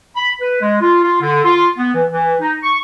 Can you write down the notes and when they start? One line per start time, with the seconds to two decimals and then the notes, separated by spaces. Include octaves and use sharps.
0.15 B5
0.41 B4
0.61 G#3
0.81 F4
1.02 F4
1.22 D3
1.45 F4
1.78 B3
1.95 E3
2.10 E3
2.40 D#4
2.63 C#6